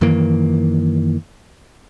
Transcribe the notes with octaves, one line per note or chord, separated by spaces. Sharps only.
F#2 D#3 E3 A#3